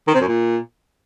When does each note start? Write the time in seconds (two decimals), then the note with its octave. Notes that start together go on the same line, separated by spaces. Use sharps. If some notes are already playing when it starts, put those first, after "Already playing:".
0.07 D#3
0.14 C3
0.21 F#2
0.28 A#2